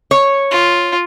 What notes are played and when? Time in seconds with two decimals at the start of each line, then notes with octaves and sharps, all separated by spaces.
0.11 C#5
0.51 F4